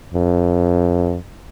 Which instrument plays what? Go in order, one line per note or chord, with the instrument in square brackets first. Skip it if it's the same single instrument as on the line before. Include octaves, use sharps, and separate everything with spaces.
[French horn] F2